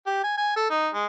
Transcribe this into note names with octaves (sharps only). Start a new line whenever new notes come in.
G4
G#5
G#5
A4
D#4
G#3